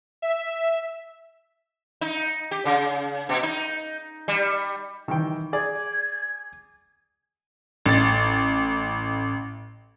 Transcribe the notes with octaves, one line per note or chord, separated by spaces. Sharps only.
E5
D#4
G4
C#3
B2
D#4
G3
D#3 E3 G5
G#4 D5 G#6
A1 A6